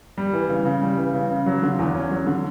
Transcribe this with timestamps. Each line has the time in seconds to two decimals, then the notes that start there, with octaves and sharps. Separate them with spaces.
0.18 G3
0.33 E3
0.49 C#3
0.65 C#3
0.82 G3
0.97 E3
1.14 C#3
1.29 C#3
1.46 F#3
1.63 D3
1.79 E2
1.94 C#4
2.11 F#3
2.27 D3